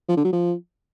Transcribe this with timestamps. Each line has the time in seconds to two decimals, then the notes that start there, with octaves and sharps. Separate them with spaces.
0.09 F3
0.17 D3
0.25 F#3
0.33 F3